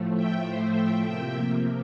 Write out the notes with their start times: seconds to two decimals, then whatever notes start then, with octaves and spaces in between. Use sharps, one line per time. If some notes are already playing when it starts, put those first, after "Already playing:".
Already playing: A2 F3 A3
0.15 E5 G5
0.45 C5 E5
0.75 E5 G5
1.04 C3 F3 A#3 E5 G5